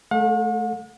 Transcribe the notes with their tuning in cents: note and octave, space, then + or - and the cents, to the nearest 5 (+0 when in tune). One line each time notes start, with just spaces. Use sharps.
A3 -25 A4 +25 F#5 -45